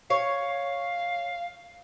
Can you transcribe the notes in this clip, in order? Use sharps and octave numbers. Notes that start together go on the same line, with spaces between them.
C#5 F5